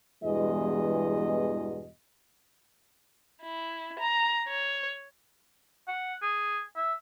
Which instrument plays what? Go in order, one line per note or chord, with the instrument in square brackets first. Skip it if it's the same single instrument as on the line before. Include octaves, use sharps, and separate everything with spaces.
[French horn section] E2 G2 B2 E3 G#3 D#5
[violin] E4
A#5
C#5
[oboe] F#5
G#4
E5